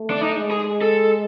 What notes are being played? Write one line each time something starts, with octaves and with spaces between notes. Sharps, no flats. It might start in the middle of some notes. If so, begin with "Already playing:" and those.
Already playing: A3
D4
D#4
G#3
G#4
A4